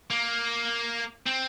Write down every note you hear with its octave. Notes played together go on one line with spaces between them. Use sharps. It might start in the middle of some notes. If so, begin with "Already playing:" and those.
A#3
C4